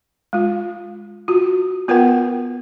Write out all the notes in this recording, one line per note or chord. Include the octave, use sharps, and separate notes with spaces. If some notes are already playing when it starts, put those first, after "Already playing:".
G#3 F4
F4 F#4
B3 F4 A#4 B4 F#5 G5